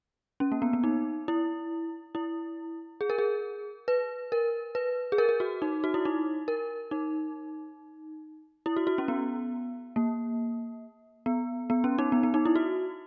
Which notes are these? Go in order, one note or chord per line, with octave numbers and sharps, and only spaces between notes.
C#4
A#3
B3
B3
D#4
E4
E4
G#4
A#4
G#4
B4
A#4
B4
G#4
A#4
G#4
F#4
D#4
F#4
E4
D#4
A#4
D#4
E4
F#4
F#4
C#4
B3
A#3
B3
B3
C#4
D#4
B3
B3
D#4
E4
F#4